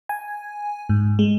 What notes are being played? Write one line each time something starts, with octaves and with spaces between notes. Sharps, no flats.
G#5
G#2
G#3